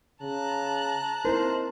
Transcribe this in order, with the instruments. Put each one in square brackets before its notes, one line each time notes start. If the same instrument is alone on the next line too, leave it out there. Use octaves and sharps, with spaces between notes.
[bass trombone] C#3 [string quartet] A5 A#5 F#6
[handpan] C4 E4 A#4 [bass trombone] D#4 [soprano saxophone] C5